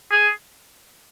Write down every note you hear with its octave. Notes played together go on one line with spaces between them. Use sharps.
G#4